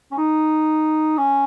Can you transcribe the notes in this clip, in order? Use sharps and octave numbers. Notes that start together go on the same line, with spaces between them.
C#4
D#4
C#4